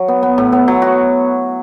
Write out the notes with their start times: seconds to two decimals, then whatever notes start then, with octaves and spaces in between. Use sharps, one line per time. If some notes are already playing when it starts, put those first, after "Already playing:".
Already playing: F#3
0.08 B3
0.23 B3
0.38 A2
0.52 B3
0.68 F#3
0.82 F#4